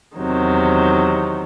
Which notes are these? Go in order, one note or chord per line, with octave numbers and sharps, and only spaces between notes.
E2 C3 D#3 F#3